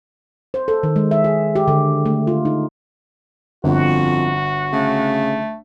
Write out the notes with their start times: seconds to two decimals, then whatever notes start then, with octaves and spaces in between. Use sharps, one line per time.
0.54 C5
0.68 A4
0.83 D#3
0.96 G#3
1.11 E5
1.24 G#4
1.55 G4
1.68 D3
2.06 A3
2.27 F4
2.45 D#4
3.64 G1 F2 F#4
4.72 C#3 A3